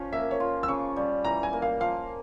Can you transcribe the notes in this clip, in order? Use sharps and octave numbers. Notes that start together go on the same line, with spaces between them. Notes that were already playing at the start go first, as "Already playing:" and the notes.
Already playing: F3 C#4
A#3 E5
C#5
F4
E6
C#3 C#6
G3
E3 A#5
G#5
A#3
F5
F3 F5